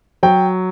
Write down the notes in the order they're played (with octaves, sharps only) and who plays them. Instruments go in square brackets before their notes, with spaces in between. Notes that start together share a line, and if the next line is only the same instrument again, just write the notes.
[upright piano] F#3 G5